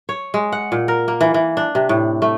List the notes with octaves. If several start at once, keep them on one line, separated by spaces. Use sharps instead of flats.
C#5
G#3
F#5
A#2
A#4
A#3
E3
E3
D4
C3
A2
A3